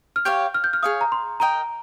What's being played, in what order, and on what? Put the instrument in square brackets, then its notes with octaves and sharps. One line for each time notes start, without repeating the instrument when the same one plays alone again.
[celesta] F6
[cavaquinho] G4 C#5 F5 [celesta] G6
[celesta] F6
G6
F6
[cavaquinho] G#4 C#5 F5 [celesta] D#6
[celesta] A#5
C6
[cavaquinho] A#4 D#5 G5 [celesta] A#5